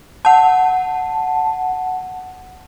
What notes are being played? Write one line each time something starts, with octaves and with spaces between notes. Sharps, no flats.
F#5 A5